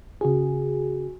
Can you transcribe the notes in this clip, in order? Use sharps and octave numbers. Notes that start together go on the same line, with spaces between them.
C#3 F#4 G#4